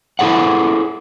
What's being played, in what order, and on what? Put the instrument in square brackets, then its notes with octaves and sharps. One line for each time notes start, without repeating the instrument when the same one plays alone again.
[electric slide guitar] E4 G#4 A4 C#5 F#5